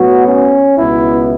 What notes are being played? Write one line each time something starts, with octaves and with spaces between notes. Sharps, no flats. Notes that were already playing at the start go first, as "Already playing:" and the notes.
Already playing: A2 F#3 B3 F#4
C#4
C#2 B2 B3 E4